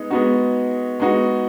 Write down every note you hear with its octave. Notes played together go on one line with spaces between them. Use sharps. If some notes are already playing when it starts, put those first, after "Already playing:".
Already playing: G#3 B3 D#4
G#3 B3 D#4 F#4
G#3 B3 D#4 F#4